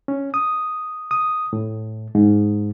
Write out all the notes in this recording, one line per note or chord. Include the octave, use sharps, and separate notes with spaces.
C#4
D#6
D#6
A2
G#2